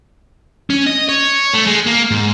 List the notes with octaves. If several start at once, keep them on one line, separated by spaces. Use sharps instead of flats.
C#4
D#5
C#5
A3
G#3
A#3
G#2